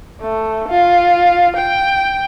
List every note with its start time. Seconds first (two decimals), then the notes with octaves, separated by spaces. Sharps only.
0.21 A3
0.68 F4
1.57 G5